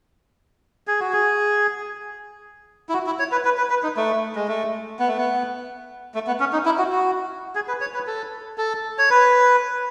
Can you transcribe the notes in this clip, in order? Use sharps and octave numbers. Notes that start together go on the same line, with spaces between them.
G#4
F#4
G#4
E4
F#4
E4
C#5
B4
B4
B4
B4
D#4
A3
G#3
A3
B3
A3
B3
A3
B3
C#4
D#4
E4
F#4
F#4
G#4
B4
C#5
B4
A4
A4
C#5
B4